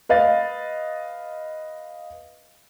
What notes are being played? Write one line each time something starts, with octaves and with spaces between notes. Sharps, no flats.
B4 D#5 F5 A6